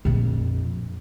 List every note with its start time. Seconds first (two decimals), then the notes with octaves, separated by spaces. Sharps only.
0.05 A#1 F2